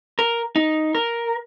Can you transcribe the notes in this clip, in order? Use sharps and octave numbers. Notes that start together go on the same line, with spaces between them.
A#4
D#4
A#4